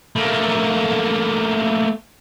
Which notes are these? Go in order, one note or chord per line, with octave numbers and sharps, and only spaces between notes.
A3 A#3